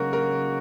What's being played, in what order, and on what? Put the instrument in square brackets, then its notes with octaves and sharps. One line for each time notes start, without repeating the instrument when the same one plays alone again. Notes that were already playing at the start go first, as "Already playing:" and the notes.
Already playing: [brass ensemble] C#3 F#3 A#3 D#4 F#4 [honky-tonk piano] A#4
[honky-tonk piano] A#4